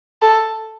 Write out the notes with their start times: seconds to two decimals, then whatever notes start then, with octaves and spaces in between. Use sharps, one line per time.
0.22 A4